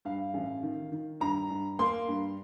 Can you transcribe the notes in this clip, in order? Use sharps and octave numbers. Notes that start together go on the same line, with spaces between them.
G2 F5
A1
D#3
D#3
G2 A#5
G2
A#3 C6
G2